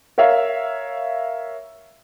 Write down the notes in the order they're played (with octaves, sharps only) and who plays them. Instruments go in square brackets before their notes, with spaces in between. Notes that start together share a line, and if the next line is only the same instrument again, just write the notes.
[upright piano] A#4 C#5 E5 F5